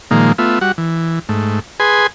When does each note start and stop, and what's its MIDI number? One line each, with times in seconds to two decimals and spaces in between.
0.11 0.32 46
0.11 0.32 51
0.11 0.32 53
0.11 0.32 56
0.11 0.32 58
0.38 0.59 57
0.38 0.59 59
0.38 0.59 65
0.38 0.59 76
0.61 0.72 55
0.61 0.72 66
0.61 0.72 78
0.78 1.19 52
1.29 1.60 44
1.29 1.60 57
1.80 2.07 68
1.80 2.07 71
1.80 2.07 80
1.80 2.07 84